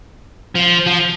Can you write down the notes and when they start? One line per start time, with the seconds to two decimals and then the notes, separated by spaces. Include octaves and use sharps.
0.55 F3
0.86 F3